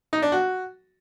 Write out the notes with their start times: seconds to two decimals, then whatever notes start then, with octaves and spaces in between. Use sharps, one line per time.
0.13 D#4
0.22 D4
0.32 F#4